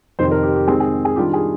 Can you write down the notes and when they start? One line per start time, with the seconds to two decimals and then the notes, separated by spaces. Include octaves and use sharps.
0.19 F2 C3 D#3 C5
0.31 A#4
0.43 G4
0.55 G4
0.67 D#3 G#3 C4 G#4
0.80 G#4
1.05 G#4
1.16 D#3 G3 D4 F4 G4
1.33 G#4